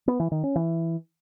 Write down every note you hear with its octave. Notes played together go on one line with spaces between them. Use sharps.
B3
E3
D#3
C#4
E3